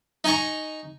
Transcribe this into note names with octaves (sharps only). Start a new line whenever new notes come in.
D#4 D#5 G#5 A#5 C#6